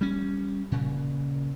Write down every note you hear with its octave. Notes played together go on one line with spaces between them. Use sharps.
G3 C#4
A#2 C#3